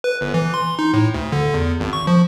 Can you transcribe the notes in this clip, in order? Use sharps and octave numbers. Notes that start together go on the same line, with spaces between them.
B4
G1
E3
C6
D#4
A2
D2
D3
E2
G#1
C#6
F3